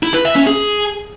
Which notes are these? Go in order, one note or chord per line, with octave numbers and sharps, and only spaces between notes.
E4
B4
E5
C#4
G#4